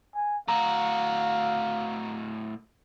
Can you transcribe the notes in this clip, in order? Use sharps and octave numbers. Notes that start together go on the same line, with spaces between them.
G#5
A2 F#4 F5 A#5